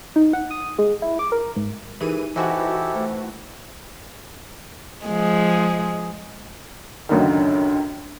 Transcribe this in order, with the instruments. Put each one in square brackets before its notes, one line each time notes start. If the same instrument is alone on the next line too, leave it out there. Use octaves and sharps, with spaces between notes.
[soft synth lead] D#4
F#5
D#6
G#3
E4
D6
A#4
G#2
[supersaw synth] E3 D#7 [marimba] D#4 [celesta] G4 G#4 A#4
[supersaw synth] E3 F#4 [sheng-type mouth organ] E4 G4 A4 [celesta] C5 D#5 G#5
[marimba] A3 [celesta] C5
[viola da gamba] F3 G#3
[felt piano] C#2 F#2 D3 D#3